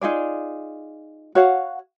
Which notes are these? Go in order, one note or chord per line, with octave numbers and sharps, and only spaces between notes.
D#4 F4 G#4 D5
F#4 C#5 F5 F#5